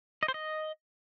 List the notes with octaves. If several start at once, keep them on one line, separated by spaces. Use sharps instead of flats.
D#5
C5
D#5